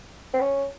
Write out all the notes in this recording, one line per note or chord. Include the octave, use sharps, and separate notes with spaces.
C4
C#4